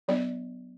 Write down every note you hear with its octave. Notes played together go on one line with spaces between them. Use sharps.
F#3 B3 D4 D5